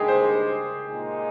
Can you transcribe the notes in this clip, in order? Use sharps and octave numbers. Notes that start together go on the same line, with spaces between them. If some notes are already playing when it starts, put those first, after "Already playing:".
Already playing: G2 D#3 G#3 G4 G#4
C5
A#2 G#3 D#4